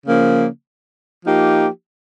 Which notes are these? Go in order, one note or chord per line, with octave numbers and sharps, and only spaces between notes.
C#3 F3 A#3
F3 A#3 D#4 G4